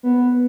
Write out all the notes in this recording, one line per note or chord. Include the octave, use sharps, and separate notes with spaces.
B3